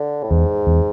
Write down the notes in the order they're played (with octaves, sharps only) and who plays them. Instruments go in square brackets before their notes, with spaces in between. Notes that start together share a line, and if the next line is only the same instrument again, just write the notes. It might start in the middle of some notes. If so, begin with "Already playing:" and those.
Already playing: [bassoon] D3
A2
[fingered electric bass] E2 [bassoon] G#2
[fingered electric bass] E2